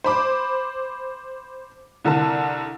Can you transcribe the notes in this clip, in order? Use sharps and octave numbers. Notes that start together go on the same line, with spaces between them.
C5 B5 D6
C2 D3 A#4 A5